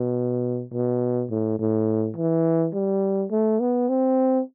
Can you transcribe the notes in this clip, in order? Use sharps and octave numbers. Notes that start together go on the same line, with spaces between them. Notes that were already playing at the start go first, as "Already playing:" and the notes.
Already playing: B2
B2
A2
A2
E3
G3
A3
B3
C4